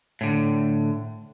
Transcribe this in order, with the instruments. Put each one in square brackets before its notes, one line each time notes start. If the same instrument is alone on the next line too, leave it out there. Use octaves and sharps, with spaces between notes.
[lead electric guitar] A2 D3